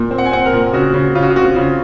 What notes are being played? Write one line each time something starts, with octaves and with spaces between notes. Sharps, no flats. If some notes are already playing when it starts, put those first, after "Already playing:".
Already playing: A#2
C4
F#5
G#5
C4 F#5
A#4
A#2
C#3 F#4
C#3
C#3 F4
F#4
F4
C4 F#4
F4
C#3 F4